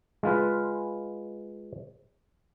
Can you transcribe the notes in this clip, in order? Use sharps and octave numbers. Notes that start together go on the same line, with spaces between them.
G#3 F4 B4